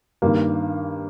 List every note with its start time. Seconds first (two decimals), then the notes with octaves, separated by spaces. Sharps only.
0.22 G2 D#3 A#3